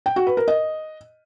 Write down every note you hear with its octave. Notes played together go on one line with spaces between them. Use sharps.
G5
F#4
B4
A#4
D#5